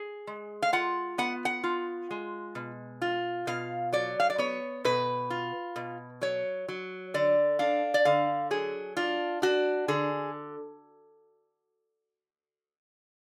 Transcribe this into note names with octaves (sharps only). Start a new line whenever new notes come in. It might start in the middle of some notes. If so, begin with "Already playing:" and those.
Already playing: G#4
G#3
F5
F4 F#5
B3 F#5
F#5
F4
G#3
B2
F4
B2 F5
F#3 D5
F5
D5
B3 C#5
B2 B4
F4
B2
F#3 C#5
F#3
D3 D5
D4 F5
D5
D3 F5
F#3 G#4
D4 F4
D4 F#4
D3 G#4